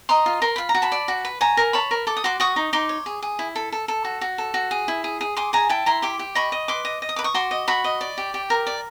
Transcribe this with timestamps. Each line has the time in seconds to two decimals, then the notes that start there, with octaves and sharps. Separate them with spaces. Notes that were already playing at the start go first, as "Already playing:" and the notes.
0.09 D#5 A#5 C6
0.26 F4
0.42 A#4 C6
0.56 F4 B5
0.69 A#5
0.75 F#4
0.82 A5 B5
0.92 D5
1.08 F#4
1.25 B4
1.41 C#5 G#5 A#5
1.57 A#4
1.73 C#5 A5 B5
1.91 A#4
2.07 A4 D6
2.17 D#6
2.24 F#4 C6 D6
2.40 F#4 C#6 D#6
2.56 D#4
2.73 D#4 C6 D6
2.89 C#5
3.06 G#4
3.22 G#4
3.39 E4
3.56 A4
3.72 A4
3.88 A4
4.05 F#4
4.21 F#4
4.38 A4
4.54 F#4
4.71 G#4
4.88 E4
5.04 G#4
5.21 G#4
5.37 G#4 C6 D6
5.53 G#4 G#5 A#5
5.69 E4 G5 A5
5.86 E4 A#5 C6
6.02 G4 C6 D6
6.19 G4
6.35 D#5 B5 C#6
6.52 D#5
6.68 B4 C6 D6
6.85 D#5
7.02 D#5
7.09 D#6
7.16 B4 D6
7.24 C#6 D#6
7.34 F#4 C6 D6
7.51 D#5
7.68 F#4 B5 C#6
7.84 D#5
8.01 D5
8.18 G4
8.34 G4
8.50 A#4
8.67 D5